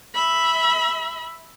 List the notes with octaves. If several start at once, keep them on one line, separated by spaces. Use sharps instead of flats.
E5 B5